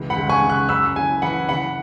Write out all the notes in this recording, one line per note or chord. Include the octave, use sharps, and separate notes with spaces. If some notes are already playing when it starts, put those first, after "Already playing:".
Already playing: C#2 E3
F#5 B5
C#2
G#5 C#6
C#3
C#6 F#6
F#2 B5 E6
F#1 G#5
E3 F#5 B5
F#1 F#5 B5